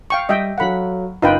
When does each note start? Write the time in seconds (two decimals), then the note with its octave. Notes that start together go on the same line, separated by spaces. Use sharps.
0.10 F5 G5 C#6
0.29 G3 D#5 E5 G5
0.58 F#3 A4 F5 F#5 B5
1.22 F#1 D#4 F4 B4 D#5 G5